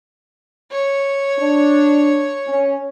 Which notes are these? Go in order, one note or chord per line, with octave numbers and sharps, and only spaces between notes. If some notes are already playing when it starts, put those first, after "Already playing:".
C#5
D4
C#4